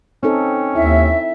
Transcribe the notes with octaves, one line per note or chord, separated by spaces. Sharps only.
C4 C#4 D#4 A4
D#2 E4 E5